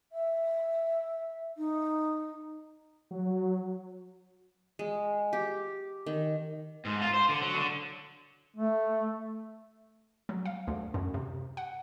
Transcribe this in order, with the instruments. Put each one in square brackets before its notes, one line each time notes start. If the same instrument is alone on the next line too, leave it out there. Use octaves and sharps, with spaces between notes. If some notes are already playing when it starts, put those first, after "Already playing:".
[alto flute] E5
D#4
[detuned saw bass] F#3
[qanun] G#3
G4
D#3
[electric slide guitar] G#2
F4
C5
D3
F#3
D3
[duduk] A3
[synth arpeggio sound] F#3
F5
D2
F#2
C3
F#5